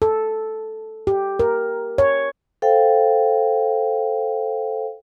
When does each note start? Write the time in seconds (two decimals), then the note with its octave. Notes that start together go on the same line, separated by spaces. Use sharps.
0.02 A4
1.07 G4
1.40 A#4
1.98 C#5
2.62 A4 C5 F5 G5